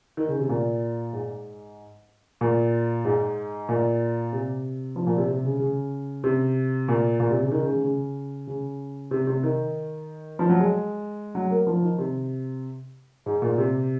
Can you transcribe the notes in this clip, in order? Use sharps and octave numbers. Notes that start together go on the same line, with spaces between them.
D#3
C#3
C3
A#2
G#2
A#2
G#2
A#2
C3
F3
A#2
C3
C3
C#3
C#3
C3
A#2
A#2
C3
C#3
D#3
C#3
C#3
C#3
C#3
C3
C3
D#3
F3
F#3
G#3
F#3
A#3
F3
D#3
C3
G#2
A#2
C3